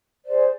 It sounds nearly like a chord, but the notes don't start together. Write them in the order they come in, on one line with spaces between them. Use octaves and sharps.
C5 D5 G#4